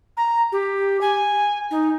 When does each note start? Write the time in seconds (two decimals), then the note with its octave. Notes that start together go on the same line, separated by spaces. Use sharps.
0.17 A#5
0.52 G4
1.01 G#5
1.71 D#4